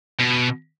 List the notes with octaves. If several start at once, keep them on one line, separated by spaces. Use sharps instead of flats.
B2